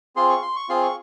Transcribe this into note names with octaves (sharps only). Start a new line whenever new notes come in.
C4 F4 G#4 C6
C#6
C6
C#6
C4 F4 G#4 C6
C#6